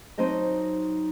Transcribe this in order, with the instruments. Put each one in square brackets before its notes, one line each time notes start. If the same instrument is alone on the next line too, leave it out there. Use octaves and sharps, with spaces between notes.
[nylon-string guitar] F#3 C4 D#4 C5 D#5 A5